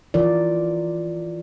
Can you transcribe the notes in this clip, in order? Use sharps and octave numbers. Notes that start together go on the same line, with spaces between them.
E3 F4 A#4 D5